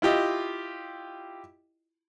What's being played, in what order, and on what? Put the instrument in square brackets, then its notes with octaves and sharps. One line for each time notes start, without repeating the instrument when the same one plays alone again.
[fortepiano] E4 F4 G4 D#5